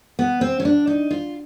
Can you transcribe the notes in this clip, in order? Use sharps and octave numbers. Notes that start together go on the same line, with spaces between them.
B3
C4
C#4
D4
D#4
F4